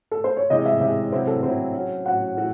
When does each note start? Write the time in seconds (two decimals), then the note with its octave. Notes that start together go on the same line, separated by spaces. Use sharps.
0.11 A4
0.24 C5
0.37 C#5
0.50 C3 E3 G#3 D#5
0.65 E5
0.81 C3 E3 G#3 E5
1.12 C3 F#3 C4 E4 C5
1.27 A4
1.43 C3 F#3 C4 E4 C5
1.74 F#3 C#4 F#4
2.04 F#3 C#4 F#4 F#5
2.37 A2 E3 A3 F#4